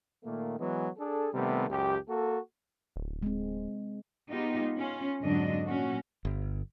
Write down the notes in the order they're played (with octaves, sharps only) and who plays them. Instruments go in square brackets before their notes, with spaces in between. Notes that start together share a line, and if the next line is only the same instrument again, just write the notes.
[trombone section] A#2 D#3 A3 A#3
E3 F#3 G#3 B3
D4 G#4 A4
C3 D#3 G3 A3 B3
C#2 F#2 G4
A#3 F#4 A4
[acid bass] D1
[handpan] G#3 C4
[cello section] G#3 B3 D#4 F4 G4
C#4 F4
F2 G#2 D3 F#3 D4 D#5
A#2 F#3 C#4 F#4
[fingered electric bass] G1